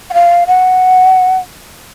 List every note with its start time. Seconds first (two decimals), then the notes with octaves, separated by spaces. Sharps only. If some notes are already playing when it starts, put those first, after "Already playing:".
0.10 F#5
0.14 F5
0.47 F#5